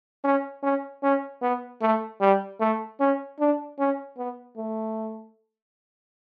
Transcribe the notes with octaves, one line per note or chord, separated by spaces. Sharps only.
C#4
C#4
C#4
B3
A3
G3
A3
C#4
D4
C#4
B3
A3